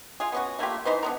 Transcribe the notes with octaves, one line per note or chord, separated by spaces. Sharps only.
F4 G#4
B3 C#4 F#4
A3 A#3 F4 G4
E3 D#4 B4 C5
D3 B3 A#4